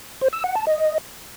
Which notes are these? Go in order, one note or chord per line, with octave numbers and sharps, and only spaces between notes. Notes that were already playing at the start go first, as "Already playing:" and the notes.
C5
E6
F#5
A5
D#5